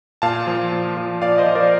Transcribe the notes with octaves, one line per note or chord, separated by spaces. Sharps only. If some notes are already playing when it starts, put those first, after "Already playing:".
A#2 F5 A5
F3
A#2
F3
A#2 D5 F5
C5 D#5
F3
A#4 D5